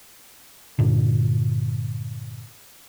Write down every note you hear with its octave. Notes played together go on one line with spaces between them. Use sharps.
G2 A#2 D3